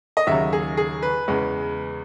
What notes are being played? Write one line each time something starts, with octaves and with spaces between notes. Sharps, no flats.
D#5
D#2 C#3 F#3 E5
G#4
G#4
B4
E2 C#3 G#3